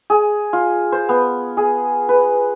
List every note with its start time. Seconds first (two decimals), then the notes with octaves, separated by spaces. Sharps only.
0.10 G#4
0.53 F4
0.92 C5
1.09 B3
1.57 G#4
2.09 B4